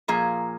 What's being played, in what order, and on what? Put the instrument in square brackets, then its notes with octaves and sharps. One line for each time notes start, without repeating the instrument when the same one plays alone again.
[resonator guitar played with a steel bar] A#2 F3 A#3 G#4